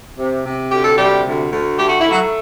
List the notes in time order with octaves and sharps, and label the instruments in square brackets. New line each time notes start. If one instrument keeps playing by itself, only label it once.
[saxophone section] C3
C3
D2 G4
A4
C3 G3 G4
D2
D2
A3 G4
F#4
A3 E4
F#3 F#4